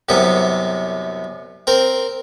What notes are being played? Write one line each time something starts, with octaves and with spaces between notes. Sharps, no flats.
C2 F#2 C3 B3 E5
C4 A#4 C5